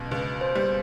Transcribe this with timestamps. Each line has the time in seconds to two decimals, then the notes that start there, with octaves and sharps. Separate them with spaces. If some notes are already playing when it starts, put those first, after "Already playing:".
Already playing: C#2 B2
0.11 C#2 B4
0.41 C5
0.55 G3